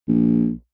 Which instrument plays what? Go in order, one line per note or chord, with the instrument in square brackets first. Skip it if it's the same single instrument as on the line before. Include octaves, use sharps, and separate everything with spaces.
[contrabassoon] A#1